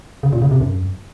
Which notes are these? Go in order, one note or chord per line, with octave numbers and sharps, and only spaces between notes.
C#3
A#2
C#3
C3
F#2